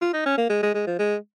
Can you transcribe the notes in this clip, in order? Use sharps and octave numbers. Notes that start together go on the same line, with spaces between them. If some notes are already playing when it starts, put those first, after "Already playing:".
F4
D#4
C#4
A#3
G#3
G#3
G#3
F3
G#3